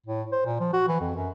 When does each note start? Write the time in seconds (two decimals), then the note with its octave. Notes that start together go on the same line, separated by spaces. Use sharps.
0.06 A2
0.32 C5
0.45 A#2
0.60 F3
0.73 F#4
0.88 E3
1.00 F2
1.16 F#2